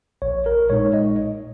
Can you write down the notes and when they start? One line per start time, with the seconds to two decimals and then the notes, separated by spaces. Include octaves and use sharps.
0.22 A#1 C#5
0.46 A#4
0.70 A#2 G#3 D#4 C#5
0.94 D#5